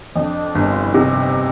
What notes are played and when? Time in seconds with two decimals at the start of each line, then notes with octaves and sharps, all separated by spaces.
0.15 F2 D4 D#4
0.55 G1
0.70 F4
0.82 E4
0.94 C3 D#4